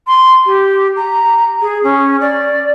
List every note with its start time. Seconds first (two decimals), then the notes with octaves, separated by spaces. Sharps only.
0.07 C6
0.46 G4
0.96 A#5
1.61 G#4
1.83 C#4
2.21 D5